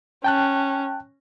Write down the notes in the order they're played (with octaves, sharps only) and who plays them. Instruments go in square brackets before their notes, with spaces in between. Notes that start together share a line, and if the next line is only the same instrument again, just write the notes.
[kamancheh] C#4 [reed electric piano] G5 A5 F#6